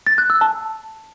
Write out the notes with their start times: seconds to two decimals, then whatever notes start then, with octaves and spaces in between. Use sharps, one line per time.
0.07 A6
0.18 F#6
0.30 E6
0.41 A5